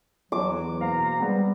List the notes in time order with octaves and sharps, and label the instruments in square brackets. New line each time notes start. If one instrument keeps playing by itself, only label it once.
[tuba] E2 [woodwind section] F#3 [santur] D6
[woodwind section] B2 C5 A#5 [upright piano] A#3 F5
[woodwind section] G3 [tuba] G#3 [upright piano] B3 C4